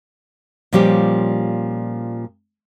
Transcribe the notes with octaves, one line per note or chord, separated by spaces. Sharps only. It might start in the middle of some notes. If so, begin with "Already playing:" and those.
A#2 F3 G3 C#4 G4